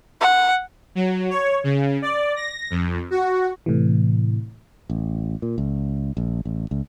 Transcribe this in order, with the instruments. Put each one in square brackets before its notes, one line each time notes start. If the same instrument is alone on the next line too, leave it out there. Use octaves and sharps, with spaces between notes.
[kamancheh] F#5
[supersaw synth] F#3
C#5
C#3
D5
A#6
F2
F#4
[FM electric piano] A2 C3 E3
[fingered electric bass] A1
A#2
C#2
A#1
A1
C#2